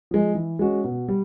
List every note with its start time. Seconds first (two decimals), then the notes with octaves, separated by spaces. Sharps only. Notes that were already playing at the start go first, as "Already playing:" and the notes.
0.11 F3 G#3
0.35 E3
0.59 G#3 C#4 F#4
0.84 B2
1.08 G3